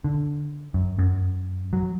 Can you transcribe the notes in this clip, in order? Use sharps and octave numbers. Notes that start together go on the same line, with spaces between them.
D3
F#2
F#2
F#3